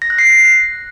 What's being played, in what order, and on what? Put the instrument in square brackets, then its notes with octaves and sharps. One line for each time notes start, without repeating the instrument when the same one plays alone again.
[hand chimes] A#6
F#6
C7